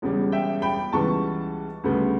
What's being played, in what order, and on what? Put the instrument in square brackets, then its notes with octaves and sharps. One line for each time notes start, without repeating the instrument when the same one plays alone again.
[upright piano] E1 E2 C#3 G3
E5 G5
G5 B5
C#2 C#3 E3 G3 B3 A5 C#6
D2 C#3 G3 B3